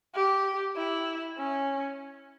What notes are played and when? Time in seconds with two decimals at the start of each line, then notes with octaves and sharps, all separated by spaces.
0.15 G4
0.76 E4
1.38 C#4